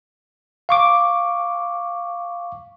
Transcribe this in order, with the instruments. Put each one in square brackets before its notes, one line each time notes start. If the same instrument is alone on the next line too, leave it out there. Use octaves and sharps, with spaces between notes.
[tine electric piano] F5 C#6 D6